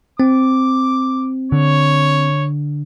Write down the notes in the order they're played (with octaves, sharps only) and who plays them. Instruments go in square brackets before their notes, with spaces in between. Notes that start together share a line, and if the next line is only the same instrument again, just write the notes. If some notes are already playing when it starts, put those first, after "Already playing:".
[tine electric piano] C4 [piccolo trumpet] D6
[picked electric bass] D3 [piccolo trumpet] C#5